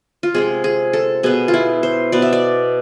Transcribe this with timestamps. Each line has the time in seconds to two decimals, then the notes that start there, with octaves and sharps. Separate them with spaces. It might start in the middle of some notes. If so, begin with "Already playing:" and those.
0.23 F4
0.34 C3 G#3 C4 G#4
0.64 G#4
0.93 A4
1.23 B2 B3 G#4
1.48 F4
1.54 E4
1.83 C5
2.12 B2 B3 D5
2.22 E5
2.33 D5